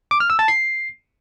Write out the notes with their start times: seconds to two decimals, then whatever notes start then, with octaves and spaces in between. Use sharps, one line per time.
0.11 D6
0.20 F6
0.30 E6
0.39 A5
0.48 C7